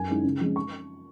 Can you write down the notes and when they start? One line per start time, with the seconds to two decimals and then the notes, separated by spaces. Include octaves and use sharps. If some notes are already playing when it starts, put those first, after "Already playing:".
Already playing: F#2 G#5
0.09 D#3 G#3 C#4 E4
0.24 C#3
0.41 F3 G#3 C#4
0.56 C#6